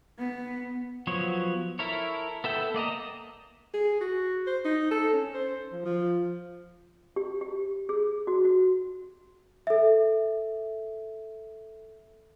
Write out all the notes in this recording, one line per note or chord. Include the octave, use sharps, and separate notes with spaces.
B3
F3 F#3 B3 C#5
E4 A4 A#4 C#5
B3 A4 E5 G5
A#3 D5 D#5 A#5
G#4
F#4
C5
D#4
A4
C#4
C5
F3
F3
G4
G4
G#4
F#4
F#4
A4 E5